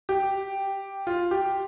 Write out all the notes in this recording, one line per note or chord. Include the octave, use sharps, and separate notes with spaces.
G4
F4
G4